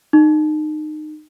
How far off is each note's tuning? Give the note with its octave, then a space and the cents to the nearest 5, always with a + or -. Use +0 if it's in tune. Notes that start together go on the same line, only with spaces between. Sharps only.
D#4 -25